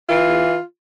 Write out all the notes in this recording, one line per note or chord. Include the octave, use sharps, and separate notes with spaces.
E3 F4
E2